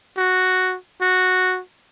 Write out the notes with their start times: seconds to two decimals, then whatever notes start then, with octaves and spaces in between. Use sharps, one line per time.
0.17 F#4
1.02 F#4